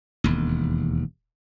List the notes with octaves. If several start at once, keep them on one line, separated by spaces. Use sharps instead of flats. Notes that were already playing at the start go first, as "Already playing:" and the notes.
E1 D#2